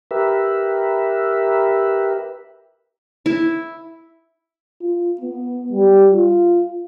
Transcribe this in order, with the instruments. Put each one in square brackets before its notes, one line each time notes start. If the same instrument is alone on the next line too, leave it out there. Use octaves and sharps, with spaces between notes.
[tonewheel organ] G4 A#4 B4 E5
[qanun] E4
[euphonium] F4
B3
G3
F4